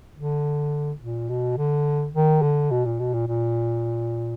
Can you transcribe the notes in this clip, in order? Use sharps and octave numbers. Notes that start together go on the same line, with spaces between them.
D3
A#2
B2
D3
D#3
D3
B2
A#2
B2
A#2
A#2